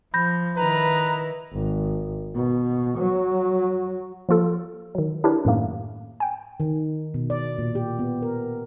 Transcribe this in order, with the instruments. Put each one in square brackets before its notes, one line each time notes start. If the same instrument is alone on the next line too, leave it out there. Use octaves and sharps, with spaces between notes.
[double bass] F3 [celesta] B5 G6 A#6
[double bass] D#3 E4 [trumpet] B4 [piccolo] A#5
[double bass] G#1
B2
F#3
[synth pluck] F3 A#3 F4 A4
D#3 F#3
D4 E4 G4 A#4 B4 C#5
F#2 A2 D#3 A3 A#3
G5 G#5
[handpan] D#3
B2
D5
A#2
G4
B3
A#4